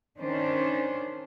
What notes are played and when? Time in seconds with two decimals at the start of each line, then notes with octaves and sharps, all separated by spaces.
0.19 D#3 C#4 D4 C5